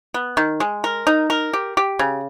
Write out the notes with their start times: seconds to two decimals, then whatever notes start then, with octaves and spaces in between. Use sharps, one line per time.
0.14 B3
0.37 D#3
0.60 G#3
0.84 A#4
1.07 D#4
1.30 A#4
1.53 G4
1.77 G4
1.99 C#3